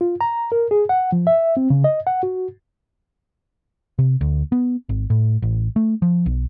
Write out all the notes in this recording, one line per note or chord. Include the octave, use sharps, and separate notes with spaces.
F4
A#5
A#4
G#4
F#5
F3
E5
C4
C#3
D#5
F#5
F#4
C3
D2
B3
G#1
A2
A1
A3
F3
B1